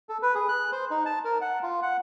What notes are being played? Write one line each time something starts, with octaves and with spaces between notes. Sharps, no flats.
A4
B4
G#4
F#6
C5
D#4
A5
A#4
F#5
F4
F#5